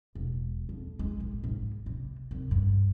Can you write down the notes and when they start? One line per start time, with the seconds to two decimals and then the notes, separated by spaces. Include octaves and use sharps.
0.15 E1
0.69 F2
0.99 G#3
1.20 A1
1.44 G#2
1.86 C3
2.31 C2
2.51 G2